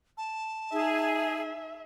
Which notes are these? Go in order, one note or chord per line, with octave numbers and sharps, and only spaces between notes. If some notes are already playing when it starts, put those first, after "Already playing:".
A5
D#4 G#4 E5